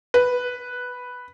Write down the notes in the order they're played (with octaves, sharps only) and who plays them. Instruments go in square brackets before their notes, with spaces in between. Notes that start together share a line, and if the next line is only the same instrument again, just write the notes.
[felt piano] B4